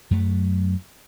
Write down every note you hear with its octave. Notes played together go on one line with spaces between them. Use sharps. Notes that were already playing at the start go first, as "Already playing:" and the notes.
F#2 F#3 A3